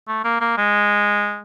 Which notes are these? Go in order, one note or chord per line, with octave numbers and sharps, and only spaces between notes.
A3
A#3
A#3
G#3